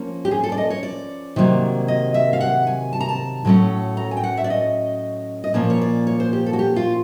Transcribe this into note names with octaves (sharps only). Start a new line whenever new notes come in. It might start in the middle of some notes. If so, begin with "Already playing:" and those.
Already playing: F3 A#3 C#4
G4
G#4
A4
D5
D#5
C#5
D5
C3 D#3 F#3 A#3
D#5
E5
F5
F#5
G#5
A5
A#5
A5
A2 F#3 A3 C#4
A#5
G#5
G5
F#5
E5
D5
D#5
D#5
A#2 F3 A#3 C#4 D5
C#5
D5
C#5
C5
G4
A4
F#4
G4
F4